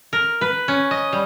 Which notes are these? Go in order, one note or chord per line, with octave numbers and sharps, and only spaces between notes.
A#4
B4
C#4
D#5
G3